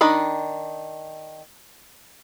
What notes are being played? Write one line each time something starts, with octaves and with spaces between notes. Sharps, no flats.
D#3 D4 D#5 B5